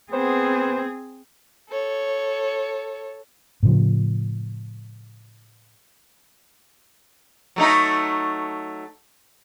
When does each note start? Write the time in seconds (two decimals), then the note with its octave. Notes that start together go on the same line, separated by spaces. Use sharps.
0.12 B3 C4 G#4 C5
1.70 A4 C#5
3.63 A2 C#3 F3
7.56 F#3 A3 D#4